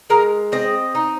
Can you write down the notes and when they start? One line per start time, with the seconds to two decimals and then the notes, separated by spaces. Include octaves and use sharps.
0.10 G#3 A#4
0.52 C4 D#5
0.95 D#4